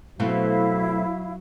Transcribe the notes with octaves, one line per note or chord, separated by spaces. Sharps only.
B2 F#3 A3 C4 E4 F5